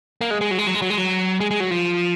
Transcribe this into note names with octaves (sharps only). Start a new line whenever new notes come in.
A#3
G#3
G#3
F#3
G#3
F#3
G#3
F#3
G#3
F#3
G#3
G#3
F#3
F3